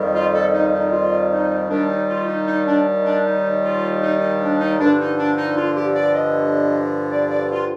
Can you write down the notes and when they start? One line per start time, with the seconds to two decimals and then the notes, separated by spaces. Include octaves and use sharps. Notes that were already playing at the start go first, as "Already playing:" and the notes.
Already playing: F2 D#3 G3
0.14 F4
0.34 A4
0.52 D#4
0.72 D#4
0.91 F4
1.31 D#4
1.69 D#2 D#3 G3 D4
1.89 D#4
2.08 F4
2.28 D#4
2.46 D#4
2.66 D4
3.05 D4
3.24 D#4
3.63 F4
4.02 D#4
4.21 D#4
4.41 D4
4.59 D#4
4.79 G2 D3 F3 D4
4.99 D#4
5.17 D4
5.37 D#4
5.57 F4
5.76 G4
5.96 D5
6.14 D#5
7.11 D5
7.31 D5
7.50 F4